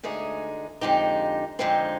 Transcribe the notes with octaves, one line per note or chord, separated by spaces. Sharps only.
D2 D3 G#3 D#4 G#4
F2 D3 G#3 D#4 G4
F2 D3 G#3 C4 D#4